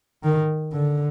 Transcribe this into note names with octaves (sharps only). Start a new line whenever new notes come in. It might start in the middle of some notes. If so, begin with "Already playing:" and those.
D#3
D3